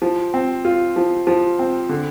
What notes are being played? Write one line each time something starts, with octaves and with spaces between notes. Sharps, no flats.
F3
C4
F4
F3
F3
C4
D3